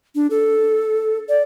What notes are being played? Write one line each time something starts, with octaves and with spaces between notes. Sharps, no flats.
D4
A4
D5